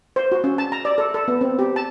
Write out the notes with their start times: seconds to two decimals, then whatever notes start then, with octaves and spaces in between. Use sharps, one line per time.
0.16 C5
0.32 F#4
0.44 C#4
0.58 A5
0.72 A#5
0.85 D5
0.98 A4
1.14 A4
1.28 B3
1.41 C4
1.59 G4
1.76 A5